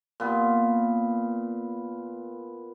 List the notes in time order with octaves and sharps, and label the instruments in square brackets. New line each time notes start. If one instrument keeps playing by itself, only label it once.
[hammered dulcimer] A#2 B3